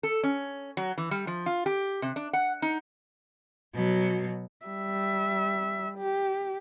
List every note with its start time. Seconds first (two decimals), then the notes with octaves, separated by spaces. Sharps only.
0.03 A4
0.23 C#4
0.77 F#3
0.98 E3
1.11 G3
1.27 F3
1.46 F4
1.66 G4
2.02 C3
2.16 D4
2.33 F#5
2.62 D#4
3.75 B2 F#3
4.66 G3 E5
5.98 G4